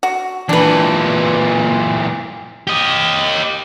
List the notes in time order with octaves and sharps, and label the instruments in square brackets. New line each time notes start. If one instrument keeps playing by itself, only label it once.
[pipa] F#4
[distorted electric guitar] A#2 E3 [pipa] D4 B4
[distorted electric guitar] G4 D#5